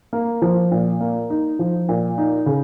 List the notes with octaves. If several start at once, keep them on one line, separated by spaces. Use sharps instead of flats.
A#3
F3
A#2
A#3
D#4
F3
A#2
D#4
C#3